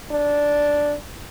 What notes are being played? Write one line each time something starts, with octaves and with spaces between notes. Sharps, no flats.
D4